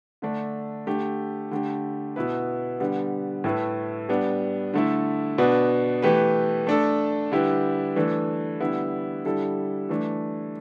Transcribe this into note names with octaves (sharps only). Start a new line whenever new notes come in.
D3 A3 D4
D3 A3 G4
D3 A3 G4
B2 B3 E4 B4
D3 G3 B3
A2 A3 E4 B4
G3 B3 D4
D3 A3 E4
B2 B3 D4 B4
E3 A3 G4 B4
A3 D4 A4
D3 G3 E4 G4 B4
E3 A3 D4 A4
D3 G3 B3 E4
D3 G3 E4 A4
E3 A3 D4